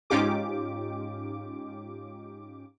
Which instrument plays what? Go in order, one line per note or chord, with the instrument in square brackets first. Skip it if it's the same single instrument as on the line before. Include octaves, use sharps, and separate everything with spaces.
[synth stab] G#2 C#4 D#4 F4 G4 D6